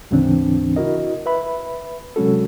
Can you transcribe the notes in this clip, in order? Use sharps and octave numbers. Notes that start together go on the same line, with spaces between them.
D2 G#2 C#3 E3 C4 D4
E4 F#4 A#4 D#5
B4 E5 B5
C3 F#3 G#3 C#4 F#4 A4